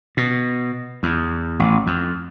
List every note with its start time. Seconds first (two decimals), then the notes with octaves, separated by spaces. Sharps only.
0.17 B2
1.03 E2
1.59 A1
1.87 F2